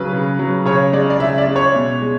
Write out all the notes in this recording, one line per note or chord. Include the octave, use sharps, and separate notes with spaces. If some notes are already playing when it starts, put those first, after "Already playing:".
Already playing: C#3 F#3 B4
C#3
F#3
C#3 C#5
G#3 D5
D5
C#3 E5
D5
G#3
C#5
B2
G#3